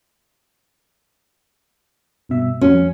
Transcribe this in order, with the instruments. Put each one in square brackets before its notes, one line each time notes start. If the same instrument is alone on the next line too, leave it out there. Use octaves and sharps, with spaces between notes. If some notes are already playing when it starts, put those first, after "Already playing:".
[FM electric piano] G2 B2 E5
[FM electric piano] F2 F#4 [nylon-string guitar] C#4